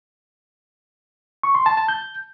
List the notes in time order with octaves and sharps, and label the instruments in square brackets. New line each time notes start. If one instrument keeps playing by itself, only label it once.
[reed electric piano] C#6
C6
A5
A5
G6